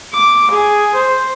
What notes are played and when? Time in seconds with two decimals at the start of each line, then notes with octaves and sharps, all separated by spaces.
0.13 D6
0.52 G#4
0.95 C5